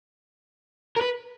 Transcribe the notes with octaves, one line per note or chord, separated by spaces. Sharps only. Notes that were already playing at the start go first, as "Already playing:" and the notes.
A#4
B4